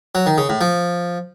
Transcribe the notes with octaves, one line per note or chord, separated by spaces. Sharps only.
F#3
D#3
C#3
A2
F3